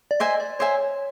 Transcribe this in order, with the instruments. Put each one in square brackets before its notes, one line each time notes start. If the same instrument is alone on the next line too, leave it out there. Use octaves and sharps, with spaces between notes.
[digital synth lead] D5
[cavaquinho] C5 E5 G#5 [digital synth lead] D#5
[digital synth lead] D5
[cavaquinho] C5 E5 G#5 [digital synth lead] C#5